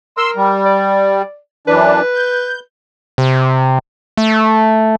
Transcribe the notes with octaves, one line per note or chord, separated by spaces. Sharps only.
A#4 C6 E6
G3
D5
F#2 E3 D4 B4
G6
C3
A3